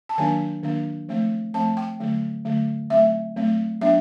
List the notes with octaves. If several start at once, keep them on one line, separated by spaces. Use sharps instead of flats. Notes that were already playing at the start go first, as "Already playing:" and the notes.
A5
D#3 F#3 A#3 D4 G#5
D#3 F#3 A#3 D4
F3 A3 C4
F3 A3 C4 A5
G5
D3 F#3 A3
D3 F#3 A3
F#3 A3 C4 E5
F#3 A3 C4
F#3 B3 D4 E5